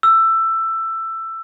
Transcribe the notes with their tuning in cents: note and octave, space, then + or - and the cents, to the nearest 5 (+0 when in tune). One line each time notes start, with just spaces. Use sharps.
E6 +15